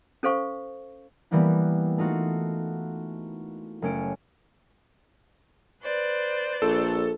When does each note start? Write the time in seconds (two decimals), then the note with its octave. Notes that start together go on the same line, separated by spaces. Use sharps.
0.23 C#4 A4 C5 F5 C#6
1.31 E3 G3 A#3 B3 E4
1.98 A3 D#4 F4 F#4
3.82 F#1 A3 C#4 D7
5.83 B4 C5 D5
6.62 A#1 A4